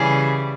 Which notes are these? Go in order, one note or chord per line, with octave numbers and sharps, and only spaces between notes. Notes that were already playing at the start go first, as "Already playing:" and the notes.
Already playing: C#3 E3 G3 G#4